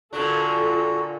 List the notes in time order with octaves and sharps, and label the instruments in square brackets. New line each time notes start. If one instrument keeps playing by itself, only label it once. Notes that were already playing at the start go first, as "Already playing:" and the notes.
[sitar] A#2 D3 D4 [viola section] F4 A4 [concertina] F#4 A#5